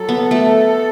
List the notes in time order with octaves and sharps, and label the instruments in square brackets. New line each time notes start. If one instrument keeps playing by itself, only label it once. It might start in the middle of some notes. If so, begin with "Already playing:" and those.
Already playing: [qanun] F#3 [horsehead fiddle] A4
[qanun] B3
A3